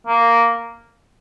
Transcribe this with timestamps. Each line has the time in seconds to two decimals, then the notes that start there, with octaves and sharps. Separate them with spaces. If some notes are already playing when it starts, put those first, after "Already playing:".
0.07 A#3